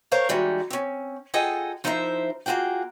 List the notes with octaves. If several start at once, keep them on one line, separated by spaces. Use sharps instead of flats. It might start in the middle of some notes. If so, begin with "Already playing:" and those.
A#4 C5 C#5 F5 A#5
E3 G3 G#3 D#4 F#4
C4 C#4
F4 G#4 A4 D#5 F#5 G5
F3 D#4 E4 A#4 C5 E5
A#3 F4 F#4 G#4 G5